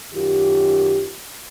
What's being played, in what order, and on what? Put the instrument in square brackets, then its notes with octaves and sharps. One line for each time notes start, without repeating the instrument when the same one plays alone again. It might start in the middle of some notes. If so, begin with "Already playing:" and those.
[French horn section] F#2 D#3 F4 G4